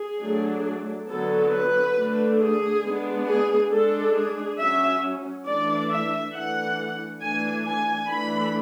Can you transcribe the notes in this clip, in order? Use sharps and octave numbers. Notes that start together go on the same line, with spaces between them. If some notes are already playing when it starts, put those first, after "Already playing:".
Already playing: G#4
F#3 A3 D4
D3 F#3 B3 A4
B4
D3 A3 D4
G#4
G#3 B3 D4
G#4
G#3 D4 A4
G#4
F#3 C#4 E5
E3 A3 D4 D5
E5
E3 A3 D4 F#5
E3 A3 D4 G#5
G#5
E3 A3 D4 B5